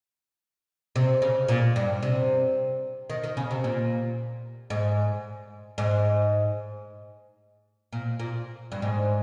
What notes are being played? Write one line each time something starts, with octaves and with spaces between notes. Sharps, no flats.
C3
C#3
A#2
G2
C3
D#3
D#3
C#3
C3
A#2
G#2
G#2
A#2
A#2
G2
G#2